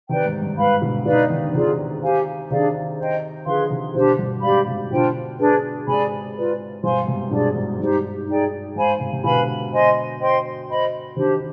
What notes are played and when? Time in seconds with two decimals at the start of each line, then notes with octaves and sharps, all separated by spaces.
0.09 C3 D#3 B4 D5 G5
0.25 G#2
0.42 G2
0.57 G#2 B4 F5 B5
0.82 B2 D3
1.06 B2 D3 D#4 B4 D5 F5
1.30 C3 D#3
1.43 D3
1.53 C3 D#3 F4 G#4 D5
2.02 G4 C5 F5 G#5
2.50 C3 D#3 D4 G#4 D5 F5
2.98 C5 D#5 G5
3.46 D3 F3 G#4 B4 F5 C6
3.70 C3 D#3
3.94 B2 D3 D4 G4 C5
4.19 G2 B2
4.42 G#2 G4 D5 F5 B5
4.67 G#2 C3
4.90 B2 D3 D4 F4 C5 G5
5.39 D4 G#4 B4
5.87 G#2 C3 G#4 D5 G#5 B5
6.36 F4 B4 D5
6.83 G2 B2 C5 F5 G#5 C6
7.07 G#2 C3
7.31 G2 B2 D4 G#4 D5
7.55 G#2
7.80 G2 D#4 G4 C5
8.27 D#4 G#4 D5 G5
8.76 G#2 C5 F5 G#5 B5
9.00 G#2 C3
9.12 C3
9.24 B2 D3 B4 F5 G#5 B5
9.72 C5 D#5 G#5 C6
10.20 C5 D#5 G5 C6
10.69 C5 D#5 B5
11.16 C3 D#3 D4 G4 C5